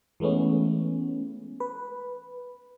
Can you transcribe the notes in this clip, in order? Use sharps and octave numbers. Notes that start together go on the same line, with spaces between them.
E3 G#3 A3 B3 C#4
B4